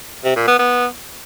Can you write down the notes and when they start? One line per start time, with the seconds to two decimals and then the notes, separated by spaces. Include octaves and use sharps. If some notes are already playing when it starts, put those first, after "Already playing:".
0.24 C3
0.36 A#2
0.48 B3
0.59 B3